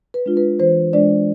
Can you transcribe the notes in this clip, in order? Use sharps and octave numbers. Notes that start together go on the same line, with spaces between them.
B4
G#3 D4 F4
B4
E3 C5
G#3 D4 D5